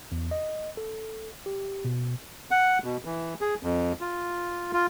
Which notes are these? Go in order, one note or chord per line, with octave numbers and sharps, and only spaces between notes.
E2
D#5
A4
G4
B2
F#5
B2
E3
G#4
F2
F4
F4